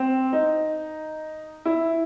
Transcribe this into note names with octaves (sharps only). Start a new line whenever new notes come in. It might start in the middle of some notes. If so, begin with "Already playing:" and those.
Already playing: C4
D#4
E4